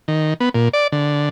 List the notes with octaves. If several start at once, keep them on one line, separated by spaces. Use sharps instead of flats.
D#3
B3
A#2
D5
D3